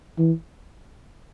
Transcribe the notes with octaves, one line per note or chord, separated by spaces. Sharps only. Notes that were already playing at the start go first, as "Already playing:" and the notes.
E3